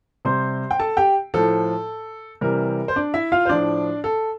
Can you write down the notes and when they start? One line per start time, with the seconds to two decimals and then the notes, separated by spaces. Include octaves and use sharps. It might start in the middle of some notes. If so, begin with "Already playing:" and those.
0.25 C3 G3 C5 C6
0.71 G5
0.80 A4 A5
0.97 G4 G5
1.34 A2 F3 A4
2.41 C3 E3 G3 A#4
2.88 C5
2.96 D4 D5
3.14 E4 E5
3.32 F4 F5
3.46 C5
3.49 A2 F3 D4 D5
4.04 A4